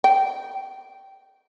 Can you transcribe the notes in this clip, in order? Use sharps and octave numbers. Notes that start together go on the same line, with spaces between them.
G5